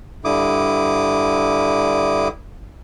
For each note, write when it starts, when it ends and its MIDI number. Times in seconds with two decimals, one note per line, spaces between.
0.25 2.28 43
0.25 2.28 50
0.25 2.28 64
0.25 2.28 86
0.25 2.28 87